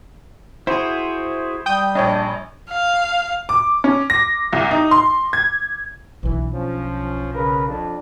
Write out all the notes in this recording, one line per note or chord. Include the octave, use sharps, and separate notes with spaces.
E4 F#4 G#4 C5
G3 G5 D#6 G6
A#1 D4 C#5 D#5
F5
D6
C#4
A#6
C2
D#4
C6
G#6
B1 E3 D4
F3 C#4
C#3 A#4 B4
F2 D4